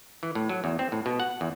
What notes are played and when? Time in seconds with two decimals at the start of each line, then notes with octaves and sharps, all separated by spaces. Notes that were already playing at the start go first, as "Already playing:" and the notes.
0.23 E3
0.35 A2
0.49 F#3
0.64 E2
0.79 C4
0.92 A2
1.06 B2
1.20 F#5
1.41 E2